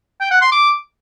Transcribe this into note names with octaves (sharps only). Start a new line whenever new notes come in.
G5
F#5
C6
D6